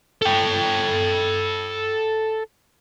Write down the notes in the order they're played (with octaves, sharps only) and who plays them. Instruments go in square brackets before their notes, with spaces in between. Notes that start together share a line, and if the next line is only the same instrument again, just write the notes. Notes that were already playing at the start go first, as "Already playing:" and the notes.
[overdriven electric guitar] A4 G5